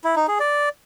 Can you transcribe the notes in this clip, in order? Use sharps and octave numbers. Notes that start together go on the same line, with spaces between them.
E4
D#4
G#4
D5